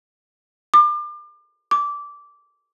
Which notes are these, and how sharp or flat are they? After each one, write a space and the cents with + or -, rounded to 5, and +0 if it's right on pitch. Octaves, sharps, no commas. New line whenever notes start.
D6 +35
D6 -15